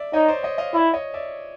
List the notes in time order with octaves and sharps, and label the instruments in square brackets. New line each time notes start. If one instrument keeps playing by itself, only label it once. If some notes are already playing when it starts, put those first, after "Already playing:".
Already playing: [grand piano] D5 E5
[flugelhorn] D#4 [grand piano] C#5 D#5
[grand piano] C5 D5
C#5 D#5
D#5 F5
[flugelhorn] E4 [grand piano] D5 E5
[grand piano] C#5 D#5
D5 E5